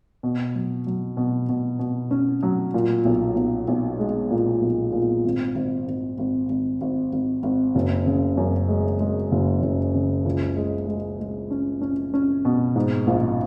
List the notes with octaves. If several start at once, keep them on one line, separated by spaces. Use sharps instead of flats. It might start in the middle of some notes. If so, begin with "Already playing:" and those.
B2
F#3
F#3
B2
B2
B2
C#4
F#3
A#2
B1
B1
B1
G#3
A#2
B1
A#2
G#1
G#1
G#1
G#1
G#1
G#1
G#1
G#1
F#1
C#3
F#2
G#3
G#3
F#1
F#1
C#3
C#2
G#3
G#3
G#3
C#4
C#4
C#4
B2
G#2
A#1